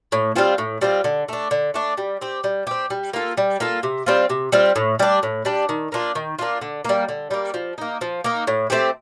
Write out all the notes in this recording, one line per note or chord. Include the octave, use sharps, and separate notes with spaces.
A2
G3 C4 F4
A2
G3 C4 F4
D3
A3 D4
D3
A3 D4
G3
C4 G4
G3
C4 G4
G3
A#3 F4 A4
G3
A#3 F4 A4
C3
G3 C4 F4
C3
G3 C4 F4
A2
G3 D4
A2
G3 D4
D#3
A#3 D4 F4
D#3
A#3 D4 F4
D3
G3 A#3
D3
G3 A#3
F3
A#3 D#4
F3
A#3 D#4
A2
A3 C4 G4